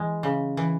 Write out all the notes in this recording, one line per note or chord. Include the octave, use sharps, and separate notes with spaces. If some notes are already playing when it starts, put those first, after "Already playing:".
Already playing: E3 G#3
C#3
E3